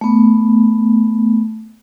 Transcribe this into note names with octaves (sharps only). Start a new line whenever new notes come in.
A3 B3